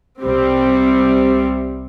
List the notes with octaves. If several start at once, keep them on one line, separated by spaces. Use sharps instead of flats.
C2 C3 G3 C4